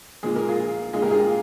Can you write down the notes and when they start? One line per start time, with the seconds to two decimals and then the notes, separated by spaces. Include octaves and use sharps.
0.23 A#2 F3 G#3 G#4
0.36 A#4
0.49 F4 G#4
0.93 A#2 G#3 F4 G#4
1.02 G4 A#4
1.11 F4 G#4